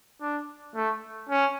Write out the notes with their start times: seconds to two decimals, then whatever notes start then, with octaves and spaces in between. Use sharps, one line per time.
0.21 D4
0.75 A3
1.29 C#4